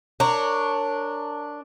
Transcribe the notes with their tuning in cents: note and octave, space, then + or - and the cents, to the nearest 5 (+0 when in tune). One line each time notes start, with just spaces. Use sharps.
D4 +0 A#4 -20 C#5 +0